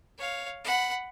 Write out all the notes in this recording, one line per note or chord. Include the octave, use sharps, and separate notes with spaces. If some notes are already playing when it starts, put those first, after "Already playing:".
C#5 F5
F#5 B5